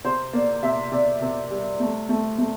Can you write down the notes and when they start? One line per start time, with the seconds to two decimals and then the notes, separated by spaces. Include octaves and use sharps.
0.04 C3 C5
0.33 A#3 D5
0.63 C3 E5
0.91 C3 D5
1.21 C3
1.50 G3
1.80 A3
2.09 A3
2.38 A3